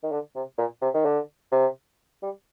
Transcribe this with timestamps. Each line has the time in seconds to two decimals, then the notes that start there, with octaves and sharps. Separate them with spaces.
0.03 D#3
0.12 D3
0.35 C3
0.58 A#2
0.82 C3
0.94 D#3
1.05 D3
1.52 C3
2.22 G3